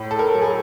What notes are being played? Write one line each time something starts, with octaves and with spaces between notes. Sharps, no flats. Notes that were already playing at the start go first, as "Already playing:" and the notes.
Already playing: A2
A4
A#4
F#3
G#4